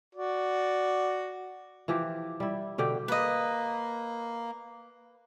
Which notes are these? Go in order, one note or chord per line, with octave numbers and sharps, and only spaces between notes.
F#4 D5
E3 F3 G4
G3 E4
B2 D3 G4 G5
A#3 B4 D#5